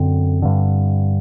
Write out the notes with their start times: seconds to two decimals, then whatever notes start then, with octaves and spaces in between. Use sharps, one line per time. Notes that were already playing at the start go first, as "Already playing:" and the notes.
Already playing: F#2 D3 C4
0.42 G2 D3